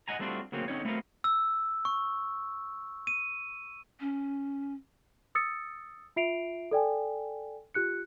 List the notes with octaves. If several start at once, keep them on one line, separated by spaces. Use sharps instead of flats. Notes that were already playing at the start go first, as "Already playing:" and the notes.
D#5 F#5 G#5 A#5
G3 A3 C4 D4 F4 F#4
D2 C#3 F#3 A#3 C4 C#4
D3 C4 C#4 D#4 C5 C#5
A3 B3 C4 F#4 A#4 F5
E6
C#6
D#7
C#4
D#6 E6 A6 C#7
F4 E5 C7 D7 F7
A4 D5 G5 G#5
F4 G4 F#6 C#7